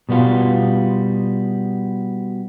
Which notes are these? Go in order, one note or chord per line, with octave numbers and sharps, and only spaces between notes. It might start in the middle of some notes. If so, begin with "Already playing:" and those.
B2 G3 B3 F4